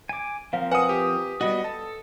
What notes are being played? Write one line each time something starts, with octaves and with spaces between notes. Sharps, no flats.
G#5 D6
F3 C4 A#4 F5
B4 F#5 G#5 D#6
G4
G3 B3 F#4 D#5
A4 A5